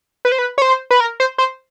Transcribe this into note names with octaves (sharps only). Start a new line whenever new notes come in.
B4
C5
B4
C#5
C5
B4
A#4
C5
C5